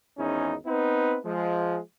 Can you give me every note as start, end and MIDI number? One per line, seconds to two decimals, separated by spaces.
0.18 0.55 32
0.18 0.55 40
0.18 0.55 61
0.18 0.55 63
0.66 1.16 59
0.66 1.16 60
0.66 1.16 63
0.66 1.16 71
1.24 1.79 53
1.24 1.79 56